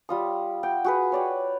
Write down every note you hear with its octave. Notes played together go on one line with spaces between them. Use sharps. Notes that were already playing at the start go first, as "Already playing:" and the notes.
G3 F4 D#6
F#5 G5
F#4 G#4 B4
C#5 D5 G5